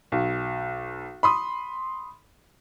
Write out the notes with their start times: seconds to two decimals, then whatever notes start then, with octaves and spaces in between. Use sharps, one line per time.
0.12 B1
1.23 B5 C6 D#6